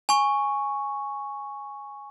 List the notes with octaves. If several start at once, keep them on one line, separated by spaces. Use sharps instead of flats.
G#5 C#6